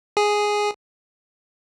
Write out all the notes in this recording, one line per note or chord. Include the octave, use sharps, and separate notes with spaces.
G#4